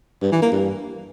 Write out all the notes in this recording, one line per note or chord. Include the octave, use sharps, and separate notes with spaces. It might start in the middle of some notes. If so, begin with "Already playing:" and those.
G2
E3
A#3
G2